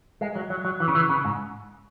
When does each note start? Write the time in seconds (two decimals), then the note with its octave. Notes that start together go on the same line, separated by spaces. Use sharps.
0.21 G#3
0.36 F#3
0.50 F#3
0.65 F#3
0.80 E3
0.88 C#3
0.95 E3
1.09 C#3
1.25 G#2